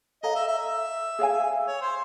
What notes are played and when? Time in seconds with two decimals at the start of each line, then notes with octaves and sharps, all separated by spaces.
0.23 A4 C#5 D#5 F5 A#5
0.36 E5
0.48 E5
0.59 E5
1.19 G#4 C#5 F5 G#5
1.66 C#5
1.81 C5